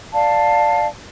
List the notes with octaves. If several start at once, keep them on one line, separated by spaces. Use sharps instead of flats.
D5 F5 A5